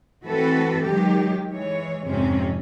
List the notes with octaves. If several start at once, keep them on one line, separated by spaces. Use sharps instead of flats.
E3 A3 C4 F#4 A4 B4
D#3 F#3 G#3 G4
E3 G#3 C#5
F2 G#2 C3 C4 C#4